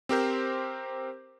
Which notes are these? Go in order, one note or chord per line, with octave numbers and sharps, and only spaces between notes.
C4 G4 A#4 C5